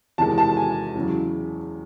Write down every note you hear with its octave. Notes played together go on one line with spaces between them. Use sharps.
E2 C3 D#3 G#3 A5
A5
G#5
E2 C#3 F#3